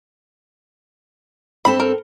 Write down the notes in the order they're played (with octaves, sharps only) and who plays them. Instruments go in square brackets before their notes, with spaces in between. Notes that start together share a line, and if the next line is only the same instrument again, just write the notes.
[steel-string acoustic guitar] G2 C4 A4 [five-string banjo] B5
[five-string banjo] A#4